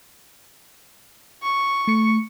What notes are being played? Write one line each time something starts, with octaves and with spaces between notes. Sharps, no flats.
C#6
A3 C#7